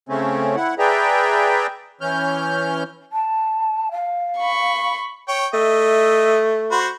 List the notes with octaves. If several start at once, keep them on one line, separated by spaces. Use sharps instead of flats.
C#3 A3 C4 C#4
E4 F#5
G#4 B4 D5 E5 G5 A#5
E3 C#4 F6 G6
A5
F5
B5 C#6
C#5 G5
A3 D#5 E5
F#4 C5 B5